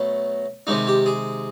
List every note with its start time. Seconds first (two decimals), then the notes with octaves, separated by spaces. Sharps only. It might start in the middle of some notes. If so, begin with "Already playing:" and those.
Already playing: B2 F#3 A3
0.67 C3 D#3 G#3 D#4
0.87 G4
1.06 G#4